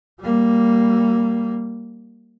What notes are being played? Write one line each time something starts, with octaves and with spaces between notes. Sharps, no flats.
G3 A#3